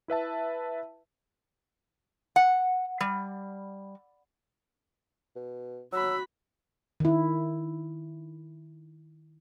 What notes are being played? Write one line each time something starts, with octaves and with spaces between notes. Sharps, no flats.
E4 B4 E5 A5
F#5
G3
B2
F#3 F#4 B5 E6
D#3 E4